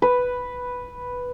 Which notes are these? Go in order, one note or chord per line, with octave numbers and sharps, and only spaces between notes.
B4